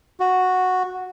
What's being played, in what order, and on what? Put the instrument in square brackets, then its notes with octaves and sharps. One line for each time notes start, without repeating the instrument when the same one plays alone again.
[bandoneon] F#4